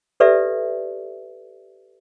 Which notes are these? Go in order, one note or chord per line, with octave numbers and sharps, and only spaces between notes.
G4 A4 B4 D5 E5